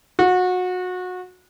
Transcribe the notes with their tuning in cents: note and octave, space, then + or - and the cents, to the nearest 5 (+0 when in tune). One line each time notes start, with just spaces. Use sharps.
F#4 -25